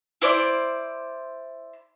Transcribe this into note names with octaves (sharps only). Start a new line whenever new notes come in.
E4 C5 D5